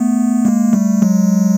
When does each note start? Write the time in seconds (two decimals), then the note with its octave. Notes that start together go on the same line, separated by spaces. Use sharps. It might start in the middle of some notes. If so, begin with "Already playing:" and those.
Already playing: A3 B3
0.45 G#3 A#3
0.73 G3 A3
1.02 F#3 G#3